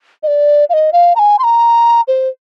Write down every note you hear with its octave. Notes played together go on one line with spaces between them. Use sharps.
D#5
D5
F5
D#5
F5
A#5
G#5
C6
A#5
C5